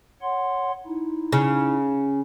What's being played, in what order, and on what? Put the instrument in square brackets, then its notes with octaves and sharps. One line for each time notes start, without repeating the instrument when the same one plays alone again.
[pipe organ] C#5 F#5 C6
D#4 E4
[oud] C#3